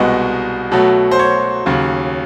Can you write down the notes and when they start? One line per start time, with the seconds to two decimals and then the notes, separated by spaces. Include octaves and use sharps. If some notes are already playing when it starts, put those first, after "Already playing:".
Already playing: C2 B2 G#3 B3 D#5
0.72 B2 F#3 A3
1.11 C5
1.19 C#5
1.66 D#2 C#3 F#3